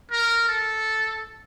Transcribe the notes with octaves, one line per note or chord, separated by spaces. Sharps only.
A#4
A4